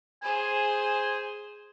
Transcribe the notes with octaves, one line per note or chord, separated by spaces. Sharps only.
G#4 C5 G#5